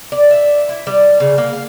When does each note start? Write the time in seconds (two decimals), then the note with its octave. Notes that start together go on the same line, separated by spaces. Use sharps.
0.12 D5
0.31 E5
0.69 E4
0.87 G3
1.20 C#3
1.38 A#3
1.53 F5